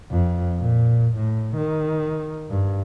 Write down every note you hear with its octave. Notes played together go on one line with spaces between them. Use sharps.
F2
A#2
A2
D#3
G2